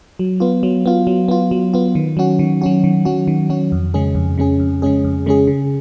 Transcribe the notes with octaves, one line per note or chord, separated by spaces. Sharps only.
F#3
B3 F4
F#3
B3 F4
F#3
B3 F4
F#3
B3 F4
D#3
F#3 C#4 F#4
D#3
F#3 C#4 F#4
D#3
F#3 C#4 F#4
D#3
F#3 C#4 F#4
F2
C#3 G#3 C#4 G#4
F2
C#3 G#3 C#4 G#4
F2
C#3 G#3 C#4 G#4
F2
C#3 G#3 C#4 G#4
C#3